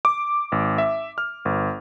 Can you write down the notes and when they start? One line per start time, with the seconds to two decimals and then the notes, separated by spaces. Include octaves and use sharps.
0.05 D6
0.52 G#1
0.78 E5
1.18 F6
1.45 G1